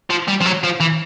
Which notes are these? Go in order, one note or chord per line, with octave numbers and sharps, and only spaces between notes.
F3
G3
F3
F#3
F3
E3